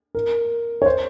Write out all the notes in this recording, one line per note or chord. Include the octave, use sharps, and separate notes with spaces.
A#4
C#5
C5